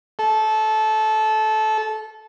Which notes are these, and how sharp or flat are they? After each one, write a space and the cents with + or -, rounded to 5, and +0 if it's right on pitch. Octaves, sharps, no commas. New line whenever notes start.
A4 -20